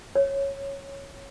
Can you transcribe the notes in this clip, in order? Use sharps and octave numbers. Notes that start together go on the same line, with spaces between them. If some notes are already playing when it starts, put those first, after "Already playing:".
C#5